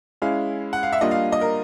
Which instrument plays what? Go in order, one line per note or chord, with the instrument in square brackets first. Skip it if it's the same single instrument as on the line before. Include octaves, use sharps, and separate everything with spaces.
[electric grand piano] G#3 C#4 E4 [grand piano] F5
[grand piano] F#5
F5
E5
[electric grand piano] G3 A#3 D4 F4 [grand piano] D#5
[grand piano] F5
D#5
A#4